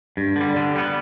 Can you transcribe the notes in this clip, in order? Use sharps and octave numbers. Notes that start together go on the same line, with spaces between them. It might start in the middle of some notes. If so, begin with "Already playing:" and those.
G2
D3 G3
D3
G3 B3